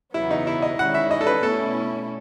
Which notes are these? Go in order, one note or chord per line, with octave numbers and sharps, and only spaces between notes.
E2 C#3 F#3 B3 E4
D#4
E4
D#5
D#3 G#3 C#4 E4 F#5
E5
D#5
A4
B4
B2 A3 C#4 E4 A4